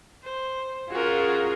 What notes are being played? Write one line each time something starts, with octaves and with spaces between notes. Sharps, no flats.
C5
C#4 F4 F#4 G#4 A#4